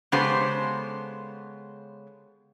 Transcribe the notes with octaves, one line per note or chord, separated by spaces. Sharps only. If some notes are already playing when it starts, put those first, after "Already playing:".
C#3 G#3 B3 G4 A4 C5